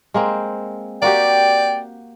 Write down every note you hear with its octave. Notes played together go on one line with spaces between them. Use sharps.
G#3 A#3 C4
A#3 F#4 G4 D5 G5